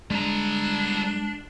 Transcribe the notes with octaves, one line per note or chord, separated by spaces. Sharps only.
G3 G#3 D4 A#5